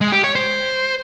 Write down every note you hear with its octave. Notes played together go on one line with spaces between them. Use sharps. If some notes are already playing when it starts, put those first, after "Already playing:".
G#3
G4
C#5
C5